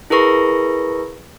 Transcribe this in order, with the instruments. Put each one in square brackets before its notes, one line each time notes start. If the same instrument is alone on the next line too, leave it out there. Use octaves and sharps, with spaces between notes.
[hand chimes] E4 G#4 A#4 B4 C#6 A#6